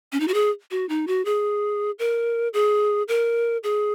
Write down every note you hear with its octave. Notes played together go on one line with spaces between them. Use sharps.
C#4
D#4
F#4
G#4
F#4
D#4
F#4
G#4
A#4
G#4
A#4
G#4